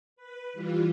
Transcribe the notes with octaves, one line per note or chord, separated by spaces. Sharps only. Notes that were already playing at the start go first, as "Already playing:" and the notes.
B4
E3 G3 F4